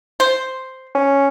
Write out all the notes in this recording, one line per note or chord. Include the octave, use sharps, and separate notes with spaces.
C5
C#4